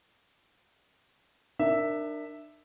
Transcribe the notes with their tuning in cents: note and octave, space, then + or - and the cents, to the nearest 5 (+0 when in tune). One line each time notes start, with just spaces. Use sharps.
D4 +30 A#4 -10 E5 +0